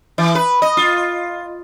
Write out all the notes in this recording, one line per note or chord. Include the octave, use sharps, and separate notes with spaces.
E3
B4
D#5
F4